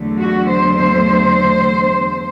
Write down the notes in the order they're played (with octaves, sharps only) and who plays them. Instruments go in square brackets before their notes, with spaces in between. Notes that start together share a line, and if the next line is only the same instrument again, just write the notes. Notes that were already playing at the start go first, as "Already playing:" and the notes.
Already playing: [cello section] E2 D3 F#3 A3
F#4
C5
C5